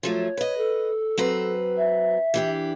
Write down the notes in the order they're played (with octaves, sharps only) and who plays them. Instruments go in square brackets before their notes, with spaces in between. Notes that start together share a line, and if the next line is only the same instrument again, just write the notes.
[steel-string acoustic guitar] F3 F#3 A3 [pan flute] C#5
[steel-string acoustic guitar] B4 D#5
[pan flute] A4
[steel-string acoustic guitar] F#3 C4 B4
[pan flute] E5
[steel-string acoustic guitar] E3 D4 G4